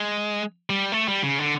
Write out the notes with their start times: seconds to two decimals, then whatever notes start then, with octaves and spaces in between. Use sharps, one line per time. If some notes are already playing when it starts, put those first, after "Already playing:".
Already playing: G#3
0.70 G3
0.92 A3
1.08 G3
1.23 C#3
1.39 D3